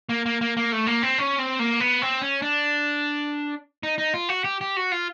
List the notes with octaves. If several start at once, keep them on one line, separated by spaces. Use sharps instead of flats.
A#3
A#3
A#3
A#3
A3
A#3
C4
C#4
C4
A#3
B3
C4
C#4
D4
D#4
D#4
F4
F#4
G4
G4
F#4
F4